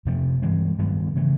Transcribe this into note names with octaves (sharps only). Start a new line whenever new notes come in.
F2 C3 F3 A3
G2 E3 G#3 C4
G2 D#3 F#3 B3
C#3 E3 A3